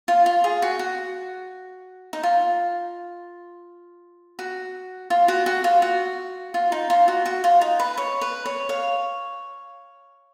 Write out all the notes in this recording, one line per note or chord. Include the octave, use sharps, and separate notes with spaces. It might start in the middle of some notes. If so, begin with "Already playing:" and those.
F4
F4
G#4
F#4
F#4
D#4
F4
F#4
F4
F#4
F#4
F4
F#4
F4
D#4
F4
F#4
F#4
F4
D#4
B4
C#5
B4
C#5
C#5 F5